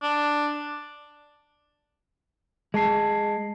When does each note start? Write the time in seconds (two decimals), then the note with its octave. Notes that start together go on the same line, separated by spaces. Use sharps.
0.03 D4
2.74 G#3 G#4 A5 C7